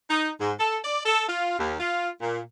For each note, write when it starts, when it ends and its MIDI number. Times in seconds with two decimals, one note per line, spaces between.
0.10 0.30 63
0.40 0.52 44
0.60 0.78 69
0.84 1.00 74
1.06 1.23 69
1.29 1.55 65
1.59 1.75 39
1.80 2.09 65
2.22 2.41 46